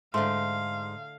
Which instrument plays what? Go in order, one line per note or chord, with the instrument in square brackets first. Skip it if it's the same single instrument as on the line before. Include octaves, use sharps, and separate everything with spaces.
[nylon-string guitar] G#2 [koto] D3 A3 [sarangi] F5 [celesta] C6